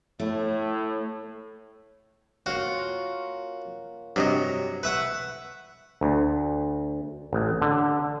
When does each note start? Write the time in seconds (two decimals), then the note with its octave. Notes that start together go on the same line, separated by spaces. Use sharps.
0.19 A2 A3
2.46 A#3 C#4 F4 F#4
4.16 G2 C3 F#3 D#5
4.83 A2 A3 B4 E5 F#5
6.01 D2
7.33 A1
7.62 D3